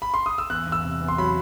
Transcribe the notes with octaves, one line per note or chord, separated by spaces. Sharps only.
B5
C6
D#6
E6
E2 F#6
E2
E6
C3
E2
C6
F#3 B5